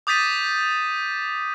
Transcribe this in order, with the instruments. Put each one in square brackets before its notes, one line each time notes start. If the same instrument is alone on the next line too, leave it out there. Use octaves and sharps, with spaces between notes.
[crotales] D6 D#6 G6 A6 B6 D#7